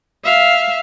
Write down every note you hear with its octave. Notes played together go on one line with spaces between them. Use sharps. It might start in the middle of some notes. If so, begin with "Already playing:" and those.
E5 F5